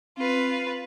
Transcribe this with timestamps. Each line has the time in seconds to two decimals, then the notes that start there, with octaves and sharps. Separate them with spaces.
0.18 C4 F4 B4